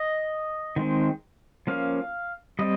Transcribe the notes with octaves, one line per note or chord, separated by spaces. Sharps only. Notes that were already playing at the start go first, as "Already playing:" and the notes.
Already playing: D#5
D#3 G#3 C4
F3 A#3 C#4 F5
G3 C4 D#5